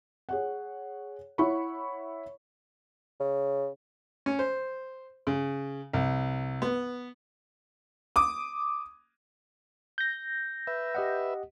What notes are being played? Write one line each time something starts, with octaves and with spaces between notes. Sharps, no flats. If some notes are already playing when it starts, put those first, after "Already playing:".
G#4 C#5 F#5
E4 C#5 F#5 B5 C#6
C#3
C#4
C5
C#3
C2
B3
D6 D#6
G6 A#6
B4 E5
G4 D#5 F#5